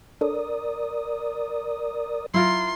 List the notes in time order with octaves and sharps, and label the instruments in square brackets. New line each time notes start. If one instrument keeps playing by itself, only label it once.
[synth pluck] D4 A4 C#5 [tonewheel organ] A#4 D5 D#6
[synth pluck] F#3 [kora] E4 F4 A#4 [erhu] C6